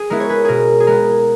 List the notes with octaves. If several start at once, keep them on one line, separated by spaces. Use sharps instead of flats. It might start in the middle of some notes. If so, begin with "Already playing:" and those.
Already playing: G#4
G#3 B3 E4 A#4
C#5
G#4 B4
B2 G#4 A#4
G#4
G#3 B3 A#4